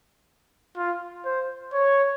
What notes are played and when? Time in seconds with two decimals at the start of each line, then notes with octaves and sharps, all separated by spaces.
0.77 F4
1.25 C5
1.74 C#5